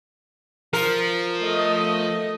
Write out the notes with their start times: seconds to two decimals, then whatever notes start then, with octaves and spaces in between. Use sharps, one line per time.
0.73 F3 A#4
1.40 A3 D#5